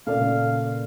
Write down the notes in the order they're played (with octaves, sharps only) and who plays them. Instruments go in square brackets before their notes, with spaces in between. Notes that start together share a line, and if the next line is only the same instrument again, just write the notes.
[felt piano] A#2 C#3 [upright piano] A4 D5 [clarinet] F5